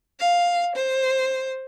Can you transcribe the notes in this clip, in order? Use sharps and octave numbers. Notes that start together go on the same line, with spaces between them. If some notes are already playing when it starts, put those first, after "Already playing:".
F5
C5